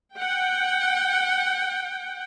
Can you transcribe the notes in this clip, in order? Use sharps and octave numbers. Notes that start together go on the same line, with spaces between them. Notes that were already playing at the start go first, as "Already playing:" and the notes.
F#5 G5